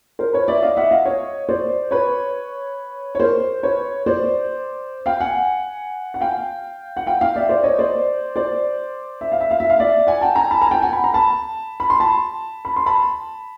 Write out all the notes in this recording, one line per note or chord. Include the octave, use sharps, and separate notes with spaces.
A#4 C5
B4 C#5
D5 E5
D#5 F5
E5 F#5
D#5 F5
C#5 D#5
C5 D5
B4 C#5
C#5
A#4 C5
B4 C#5
C5 D5
F5 G5
F#5 G#5
F#5
F5 G5
F#5
F5 G5
F5 G5
D5 E5
C5 D5
C#5 D#5
C5 D5
C5 D5
E5
F5
E5
F5
E5
F5
D5 E5
F#5 G#5
G5 A5
G#5 A#5
A5 B5
G#5 A#5
G5 A5
F#5 G#5
B5
A#5
A5 B5
B5
C6
A5 B5
B5
C6
A5 B5